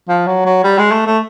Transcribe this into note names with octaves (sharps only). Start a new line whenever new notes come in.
F3
F#3
F#3
G3
G#3
A3
A3